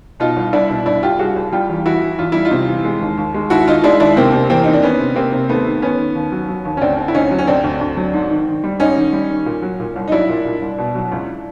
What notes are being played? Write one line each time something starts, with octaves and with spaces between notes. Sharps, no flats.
B2 D#4 F4
C2
C2 D4 E4
B2
C2 D4 E4
C2 F4 G4
C2 F#4 G#4
C2
G3 F4 G4
E2
E3 E4 F#4
E3
E2 F4
G3 E4
D#4 F4
C3
E3
G#3
D#2
D#2
G#3
D#2 E4 F#4
D#3 D#4 F4
G#3 D4 E4
D#2 D4 E4
C3 A#3 C4
C3
E2 A#3 C4
D#3 D#4
D4
D#3 B3 C#4
C3
C3 A#3 C4
C3
D#2 A3 B3
D#3
D#3 B3 C#4
D#3
D#2
F#3
F#3
D#2
C#4
D2 C4 D4
D3
E4
D2 C#4 D#4
F#3
C#4
D2 C4 D4
D2
D2
F#3
G#2
D#3
D#3
G3
G#2 C#4 D#4
D#3
G3
D#3
A#2
F#3
A#2
C2
D#4
F#3 D4 E4
A#2
A#2
C2
B2
F#3
C#2